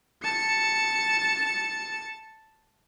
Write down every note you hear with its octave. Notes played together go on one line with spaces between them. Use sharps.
A5 C#7